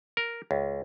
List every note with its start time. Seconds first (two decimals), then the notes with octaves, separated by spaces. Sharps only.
0.17 A#4
0.51 C#2